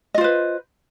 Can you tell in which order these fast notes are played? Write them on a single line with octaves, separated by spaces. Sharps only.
D#5 F4 C5 B4